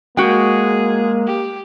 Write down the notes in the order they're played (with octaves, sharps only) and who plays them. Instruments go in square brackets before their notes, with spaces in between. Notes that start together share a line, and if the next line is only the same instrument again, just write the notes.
[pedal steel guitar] G#3 [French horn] A#3 [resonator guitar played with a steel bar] F#4 G5 [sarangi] G#4
[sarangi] G4